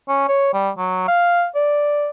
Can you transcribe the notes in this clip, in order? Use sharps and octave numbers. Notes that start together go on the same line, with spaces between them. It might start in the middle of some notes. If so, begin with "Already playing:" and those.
C#4
C#5
G3
F#3
F5
D5